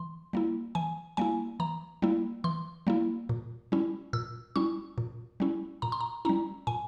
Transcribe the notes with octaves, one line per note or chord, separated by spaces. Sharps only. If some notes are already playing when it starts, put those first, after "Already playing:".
Already playing: E3 C6
G3 A#3 E4
E3 G#5
G3 A#3 E4 G#5
E3 A#5
G3 A#3 E4
E3 C6
G3 A#3 E4
A#2
G3 C#4 E4
A#2 E6
G3 C#4 E4 C#6
A#2
G3 C#4 E4
A#2 A#5
C6
A#5
G3 C#4 E4 A#5
A#2 G#5